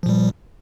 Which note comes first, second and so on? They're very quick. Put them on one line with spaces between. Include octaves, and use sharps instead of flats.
F3 A#2 G3